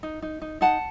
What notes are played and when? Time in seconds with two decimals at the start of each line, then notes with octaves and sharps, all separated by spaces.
0.03 D#4
0.22 D#4
0.42 D#4
0.61 D#4 F#5 A5